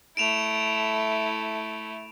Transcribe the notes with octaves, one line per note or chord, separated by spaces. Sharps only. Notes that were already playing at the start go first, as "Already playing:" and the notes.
A3 E4 D7 E7 F7